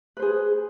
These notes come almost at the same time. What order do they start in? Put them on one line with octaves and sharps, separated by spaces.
B4 C5 G#4